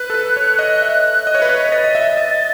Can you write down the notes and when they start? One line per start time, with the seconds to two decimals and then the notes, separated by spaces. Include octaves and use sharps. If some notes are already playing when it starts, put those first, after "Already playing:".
Already playing: B4 F#6
0.10 A4
0.14 B4
0.37 C#5
0.59 D#5
0.82 E5
1.27 D#5
1.35 C#5
1.42 B4
1.49 C#5
1.61 B6
1.72 D#5 A6
1.84 D#5
1.95 E5
2.17 D#5